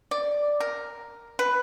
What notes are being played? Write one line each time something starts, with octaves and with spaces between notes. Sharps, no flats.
D5
A#4
B4